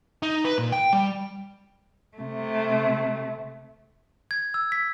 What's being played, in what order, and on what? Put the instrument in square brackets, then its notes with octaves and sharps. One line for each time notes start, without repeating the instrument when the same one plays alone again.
[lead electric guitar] D#4
B4
A#2
G5
G3
[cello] C3 A3
[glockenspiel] G#6
E6
B6